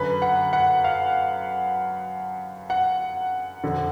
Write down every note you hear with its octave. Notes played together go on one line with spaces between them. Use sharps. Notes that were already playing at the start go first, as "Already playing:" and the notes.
Already playing: F#2 D3 B4
F#5
F#5
F5
F#5
F2 D3